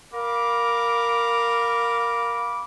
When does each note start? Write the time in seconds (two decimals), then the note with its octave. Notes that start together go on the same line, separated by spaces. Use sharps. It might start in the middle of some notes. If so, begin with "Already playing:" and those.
0.13 A#4 F5 B5 D6